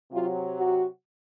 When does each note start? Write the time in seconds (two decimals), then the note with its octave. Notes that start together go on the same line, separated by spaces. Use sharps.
0.11 C3 F#3 F4
0.57 F#4